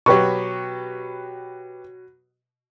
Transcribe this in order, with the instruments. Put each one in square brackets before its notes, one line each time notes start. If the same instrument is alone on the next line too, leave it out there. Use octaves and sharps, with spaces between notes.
[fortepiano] B2 F#3 [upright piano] G4 B4 C#6